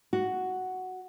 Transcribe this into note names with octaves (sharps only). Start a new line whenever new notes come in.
F#4